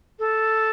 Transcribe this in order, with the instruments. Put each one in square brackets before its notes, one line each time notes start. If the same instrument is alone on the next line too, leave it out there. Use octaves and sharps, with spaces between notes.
[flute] A4